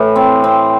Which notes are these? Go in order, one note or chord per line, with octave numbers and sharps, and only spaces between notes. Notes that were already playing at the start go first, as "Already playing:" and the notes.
Already playing: A2 E3
C4
C4